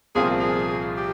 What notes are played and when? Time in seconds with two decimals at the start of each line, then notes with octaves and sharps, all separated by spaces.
0.15 C2 A#2 F3 C4 F4 G#4
0.40 G#4
0.97 G4